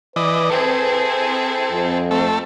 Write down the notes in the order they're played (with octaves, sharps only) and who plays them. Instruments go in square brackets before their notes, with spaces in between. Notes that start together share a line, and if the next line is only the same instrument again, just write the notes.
[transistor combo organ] E3 D5 D#5 [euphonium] B4
[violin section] C4 E4 G#4 [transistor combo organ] A4
[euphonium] F2
[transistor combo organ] A3 A4 [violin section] C4